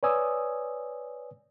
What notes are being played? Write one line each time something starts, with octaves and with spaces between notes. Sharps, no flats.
B4 C#5 D5 G#5 D#6 E6